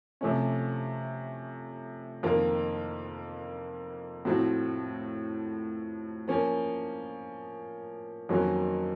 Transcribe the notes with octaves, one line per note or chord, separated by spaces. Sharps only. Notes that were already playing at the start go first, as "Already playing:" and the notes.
C3 F3 A3 C#4
F2 D#3 A#3 F4
A2 F3 C4 F#4
F3 A#3 C#4
F2 D#3 F#3 A#3 C#4